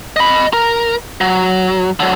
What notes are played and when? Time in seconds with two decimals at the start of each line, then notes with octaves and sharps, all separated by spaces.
0.16 D#5 B5
0.53 A#4
1.21 F#3
2.00 D3 F#3